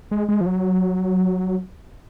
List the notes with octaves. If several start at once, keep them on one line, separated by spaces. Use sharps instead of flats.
G#3
G#3
F3
F#3